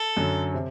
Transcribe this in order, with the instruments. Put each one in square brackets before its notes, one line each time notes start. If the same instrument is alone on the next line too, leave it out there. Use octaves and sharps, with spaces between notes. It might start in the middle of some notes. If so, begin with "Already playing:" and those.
Already playing: [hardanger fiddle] A4
[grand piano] F#2 D3 F#3
C3